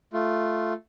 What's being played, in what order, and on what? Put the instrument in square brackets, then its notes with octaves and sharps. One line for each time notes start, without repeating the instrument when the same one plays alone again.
[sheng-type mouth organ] A3 F4